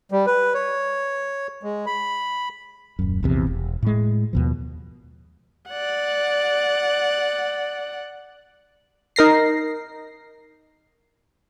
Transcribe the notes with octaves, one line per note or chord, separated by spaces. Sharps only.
G3
B4
C#5
G#3
B5
D#1 F#2
A#1 E2 C3
E1
A2 G#3
D#2 B2 F3
D5 F#5
D#4 A#4 A#6 C7